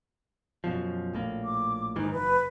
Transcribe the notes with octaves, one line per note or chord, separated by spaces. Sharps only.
F#2 B2 F3
A#1 A2 A#3
D6
G#2 D#3 E3 D#4
F#1 B4